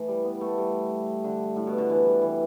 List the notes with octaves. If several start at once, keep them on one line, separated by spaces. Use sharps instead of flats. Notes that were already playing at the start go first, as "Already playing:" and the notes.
Already playing: E3 A3
G3
B3
A3
G3
D3
A2
B2
D3
E3
G3
E3